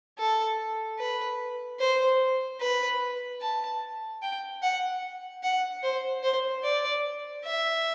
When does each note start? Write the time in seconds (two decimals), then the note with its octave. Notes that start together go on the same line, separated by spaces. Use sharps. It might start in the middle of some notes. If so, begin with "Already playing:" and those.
0.18 A4
0.99 B4
1.80 C5
2.61 B4
3.41 A5
4.22 G5
4.62 F#5
5.43 F#5
5.83 C5
6.23 C5
6.63 D5
7.45 E5